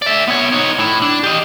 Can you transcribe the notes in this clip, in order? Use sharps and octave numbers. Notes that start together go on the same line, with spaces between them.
D5 E5
B3 C#5
D#4 C#5
A2 E4
D4
G4 D#5